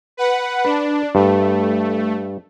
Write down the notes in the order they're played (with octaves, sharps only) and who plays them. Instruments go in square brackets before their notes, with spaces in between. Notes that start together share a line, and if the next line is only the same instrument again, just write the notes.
[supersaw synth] B4 F#5
[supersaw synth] D4 [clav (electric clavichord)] B4
[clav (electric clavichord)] G2 [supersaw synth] A3